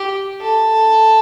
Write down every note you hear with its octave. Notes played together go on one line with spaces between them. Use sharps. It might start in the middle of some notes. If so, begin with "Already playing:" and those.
Already playing: G4
A4